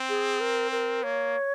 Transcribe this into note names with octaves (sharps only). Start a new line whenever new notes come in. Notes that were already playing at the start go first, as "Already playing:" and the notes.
Already playing: C4
G#4
A#4
A#4
A#3 C#5